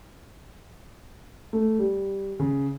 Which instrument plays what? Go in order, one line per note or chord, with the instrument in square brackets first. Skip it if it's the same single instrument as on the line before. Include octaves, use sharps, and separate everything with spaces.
[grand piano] A3
G3
C#3